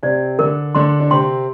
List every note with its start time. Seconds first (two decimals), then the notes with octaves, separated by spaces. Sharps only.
0.03 C3 C4 D5
0.39 D3 D4 A#4
0.75 D3 D4 C6
1.00 D4
1.10 C3 C4 C6